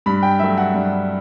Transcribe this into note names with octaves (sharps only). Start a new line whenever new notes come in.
G2 B5
G5
F#3 A3 E5
F#5
G2